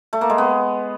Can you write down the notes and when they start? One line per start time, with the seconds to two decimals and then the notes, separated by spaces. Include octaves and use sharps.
0.13 A3
0.21 A#3
0.30 G#3
0.38 B3